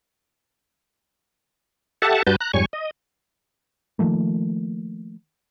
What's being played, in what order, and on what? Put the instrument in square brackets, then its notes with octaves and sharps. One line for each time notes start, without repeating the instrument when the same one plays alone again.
[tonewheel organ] G4 A4 E5 F#5 A5
G2 G3 F#4 B4 A5 G6
A#5 F#6
F2 G#2 G3 C#5 G#5 C#6
D#5
[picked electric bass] D#3 F3 A3 A#3